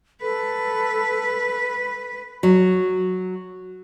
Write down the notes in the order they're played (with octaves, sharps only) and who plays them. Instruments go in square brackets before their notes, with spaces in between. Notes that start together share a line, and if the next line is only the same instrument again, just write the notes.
[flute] A4 [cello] B4
[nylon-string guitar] F#3